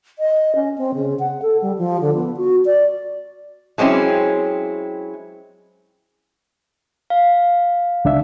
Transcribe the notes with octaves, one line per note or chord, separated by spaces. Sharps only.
D#5
C#4
C4
C#3
F#5
A4
G3
F3
D3
B3
F#4
D5
F#3 G#3 C4 C#4 E4
F5
C#2 D4 E5